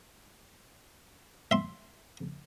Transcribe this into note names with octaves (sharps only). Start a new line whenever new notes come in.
E5 C6